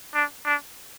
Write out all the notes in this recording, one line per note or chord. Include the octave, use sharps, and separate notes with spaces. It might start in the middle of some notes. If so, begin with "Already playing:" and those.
D4
D4